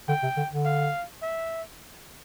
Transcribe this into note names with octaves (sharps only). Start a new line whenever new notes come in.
D3 G5
C3
D3
D3
F5
E5